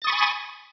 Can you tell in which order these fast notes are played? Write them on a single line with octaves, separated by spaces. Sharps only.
A6 D#6 C#6 B5 G#5